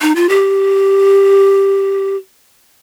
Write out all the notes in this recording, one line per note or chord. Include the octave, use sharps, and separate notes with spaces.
D#4
F4
G4